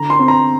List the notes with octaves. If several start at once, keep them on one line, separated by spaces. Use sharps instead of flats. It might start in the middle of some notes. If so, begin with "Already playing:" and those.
Already playing: D3 A#5
C6
C4
A#5